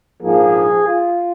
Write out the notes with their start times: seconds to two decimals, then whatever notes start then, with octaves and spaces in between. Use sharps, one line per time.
0.22 A#1 G#2 F3 A#3 G#4
0.86 F4